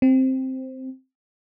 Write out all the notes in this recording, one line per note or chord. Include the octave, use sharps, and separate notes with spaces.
C4